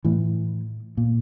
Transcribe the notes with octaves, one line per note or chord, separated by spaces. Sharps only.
A2 E3
A#2